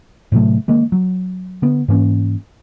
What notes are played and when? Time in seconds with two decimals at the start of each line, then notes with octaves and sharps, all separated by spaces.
0.32 A2 C3 F#3 A3
0.68 D#3 G#3 A#3
0.92 F#3
1.62 D3 B3
1.88 G#2 E3 A#3 C#4